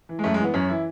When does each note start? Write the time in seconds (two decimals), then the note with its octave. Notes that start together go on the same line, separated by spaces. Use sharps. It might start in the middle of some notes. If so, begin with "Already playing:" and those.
0.09 E3
0.19 G#3
0.24 F#2 A3
0.34 G#3
0.39 E3 B3
0.54 F#2 C#4
0.69 E3 E4